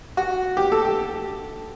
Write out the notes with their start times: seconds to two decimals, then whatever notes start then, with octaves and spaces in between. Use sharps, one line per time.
0.17 F#4
0.57 G4
0.72 A4
0.85 G4